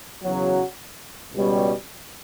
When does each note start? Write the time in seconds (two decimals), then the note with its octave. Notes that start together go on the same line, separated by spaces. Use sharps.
0.23 E2 C#3 F#3
1.32 C#2 B2 G3 C#4